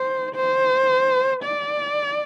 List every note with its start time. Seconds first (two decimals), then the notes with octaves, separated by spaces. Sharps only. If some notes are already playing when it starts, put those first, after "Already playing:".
Already playing: C5
0.35 C5
1.44 D5